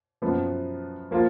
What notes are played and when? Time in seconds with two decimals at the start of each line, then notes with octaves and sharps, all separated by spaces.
0.22 F#2 F3 B3
1.11 F3 A#3 F4